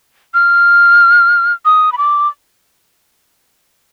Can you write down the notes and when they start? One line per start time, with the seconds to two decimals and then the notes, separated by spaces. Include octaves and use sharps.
0.34 F6
1.65 D#6
1.92 B5
1.98 D6